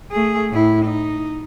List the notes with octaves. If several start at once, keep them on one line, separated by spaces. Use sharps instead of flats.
A3 G#4
A2 E4
D#4